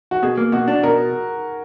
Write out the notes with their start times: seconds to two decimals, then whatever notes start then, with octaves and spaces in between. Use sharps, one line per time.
0.11 F#4
0.23 B2 G#4
0.37 A#3
0.52 B2 F#4
0.68 D4
0.83 B2 A#4